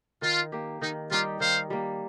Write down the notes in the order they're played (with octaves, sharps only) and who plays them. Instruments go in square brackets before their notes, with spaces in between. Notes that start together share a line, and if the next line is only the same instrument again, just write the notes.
[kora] D#3 [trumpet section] F4
[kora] A#3 G4
[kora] D#3 [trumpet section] D#4
[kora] G3 D#4 G4 [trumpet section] F4
[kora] D#3 [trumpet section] C5 F5
[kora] G3 A#3